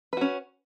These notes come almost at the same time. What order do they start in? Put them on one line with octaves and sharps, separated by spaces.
B4 F#4 C#4